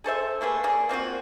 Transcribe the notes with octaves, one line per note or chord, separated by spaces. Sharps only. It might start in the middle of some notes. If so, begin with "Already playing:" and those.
G#4 A4 C5 E5
A3 A#3 G#4 B4
A#3 G#4 D5
A#3 C4 F4 F#4